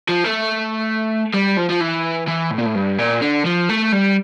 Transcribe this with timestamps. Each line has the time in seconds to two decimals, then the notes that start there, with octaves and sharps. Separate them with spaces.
0.08 F3
0.24 A3
1.34 G3
1.57 F3
1.70 F3
1.81 E3
2.28 E3
2.51 A2
2.58 A#2
2.66 A2
2.75 G2
2.98 A#2
3.21 D3
3.45 F3
3.69 A3
3.92 G3